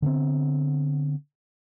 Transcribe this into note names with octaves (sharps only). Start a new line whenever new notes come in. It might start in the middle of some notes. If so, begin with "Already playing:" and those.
D3 B3 C4